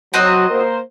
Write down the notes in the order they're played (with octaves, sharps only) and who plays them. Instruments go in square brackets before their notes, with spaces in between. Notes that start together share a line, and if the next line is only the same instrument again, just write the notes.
[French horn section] F#3 [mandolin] C4 F#4 D#5
[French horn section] A#3 A#4 C5